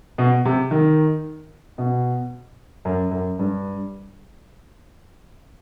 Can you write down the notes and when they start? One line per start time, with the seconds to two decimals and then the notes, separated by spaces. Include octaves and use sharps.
0.18 B2
0.45 C3
0.71 D#3
1.78 B2
2.85 F#2
3.11 F#2
3.39 G2